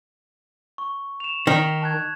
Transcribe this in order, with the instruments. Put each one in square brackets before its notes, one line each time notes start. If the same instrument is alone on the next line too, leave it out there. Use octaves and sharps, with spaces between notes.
[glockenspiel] C#6
E7 F7
[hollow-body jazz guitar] D#3
[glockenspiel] A5 F#6 G#6